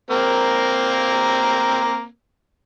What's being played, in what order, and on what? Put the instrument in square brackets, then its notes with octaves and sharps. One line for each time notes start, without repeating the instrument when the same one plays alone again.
[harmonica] A#3 C4 A#4